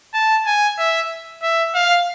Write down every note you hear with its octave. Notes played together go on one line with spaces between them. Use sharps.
A5
G#5
E5
E5
F5